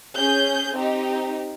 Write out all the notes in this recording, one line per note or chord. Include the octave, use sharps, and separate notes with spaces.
C#4 G#4 G6
C4 D#4 G4